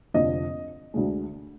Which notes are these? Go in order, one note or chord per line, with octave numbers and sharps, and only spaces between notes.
F1 F2 D3 F3 D#5
D2 D3 G#3